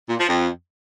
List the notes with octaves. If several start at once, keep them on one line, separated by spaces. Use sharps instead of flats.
A#2
F3
F2